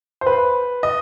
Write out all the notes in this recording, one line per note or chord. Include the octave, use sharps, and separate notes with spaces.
C5
B4
D#5